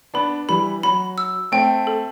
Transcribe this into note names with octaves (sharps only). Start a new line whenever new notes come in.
B3 D4 B5
E3 G3 B5
F#3 B5
E6
A3 C4 G5
A4